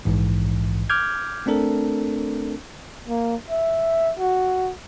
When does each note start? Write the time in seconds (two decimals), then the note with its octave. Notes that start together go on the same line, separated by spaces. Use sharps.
0.05 A#1 G#2 E3
0.90 D6 F6 G6 G#6
1.46 A3 C4 D4 A4 A#4
3.08 A#3
3.50 E5
4.19 F#4